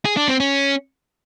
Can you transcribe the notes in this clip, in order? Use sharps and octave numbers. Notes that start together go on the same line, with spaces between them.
G#4
D4
C4
C#4